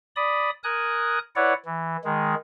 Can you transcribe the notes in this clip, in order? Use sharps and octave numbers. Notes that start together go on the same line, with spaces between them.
D5 B5 D#6
A#4 G#5 D#6 F#6
E4 B4 C#5 D5 F#5
E3
D#3 G#3